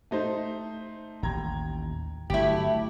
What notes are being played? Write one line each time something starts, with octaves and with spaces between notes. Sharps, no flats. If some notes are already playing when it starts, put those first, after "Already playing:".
A3 D#4 C5
A1 D#2 G5 A#5 G#6
G1 A#2 F#3 A3 E4 G4